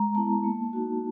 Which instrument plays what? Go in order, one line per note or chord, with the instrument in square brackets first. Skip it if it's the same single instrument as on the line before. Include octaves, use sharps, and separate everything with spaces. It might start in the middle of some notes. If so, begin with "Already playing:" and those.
Already playing: [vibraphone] G#3 A#5
B3 E4 A5
A#3
D#4 F#4